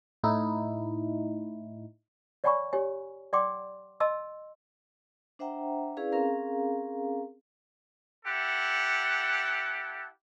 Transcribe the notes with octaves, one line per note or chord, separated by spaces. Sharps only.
A2 D#4 E4
C#5 D5 F#5 G#5 B5 C#6
G4 C#5 G#5
D5 F#5 G5 C6 D6
D#5 A5 C6 E6
D4 C5 E5 F#5 G5 A#5
C#4 E4 G#4 B4 D5 F5
C4 C#4 G#4 A#4 F5 A#5
E4 G4 A4 F#5